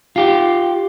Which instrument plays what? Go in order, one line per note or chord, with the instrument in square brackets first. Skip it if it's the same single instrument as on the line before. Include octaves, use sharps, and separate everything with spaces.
[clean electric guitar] F4 G4